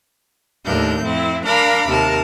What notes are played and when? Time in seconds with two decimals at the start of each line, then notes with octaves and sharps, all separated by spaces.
0.64 D#2 A2 D4 A#4 G6
1.04 F2 C4 E4
1.44 D4 A#4 F5 A#5 B5 D6
1.87 D#2 C3 A#4 A5